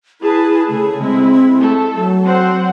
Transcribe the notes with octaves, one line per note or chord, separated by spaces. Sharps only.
E4 G#4 B4 A5
C#3 A3 G#4
G#3 C4 E4
A3 A4
F#3
C4 C5 F#5